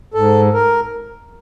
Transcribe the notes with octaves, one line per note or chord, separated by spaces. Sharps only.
G#2 A4
A#4